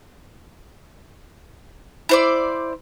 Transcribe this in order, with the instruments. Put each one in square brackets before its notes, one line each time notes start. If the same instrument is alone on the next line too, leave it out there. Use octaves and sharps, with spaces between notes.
[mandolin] E4 C5 D5